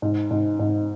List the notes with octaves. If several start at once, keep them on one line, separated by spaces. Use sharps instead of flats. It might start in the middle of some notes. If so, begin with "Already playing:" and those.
G#2
G#2
G#2